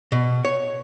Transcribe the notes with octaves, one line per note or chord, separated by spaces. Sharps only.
B2
C#5